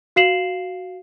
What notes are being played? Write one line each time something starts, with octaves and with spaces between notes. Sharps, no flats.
F#4 F5 C7 E7 F#7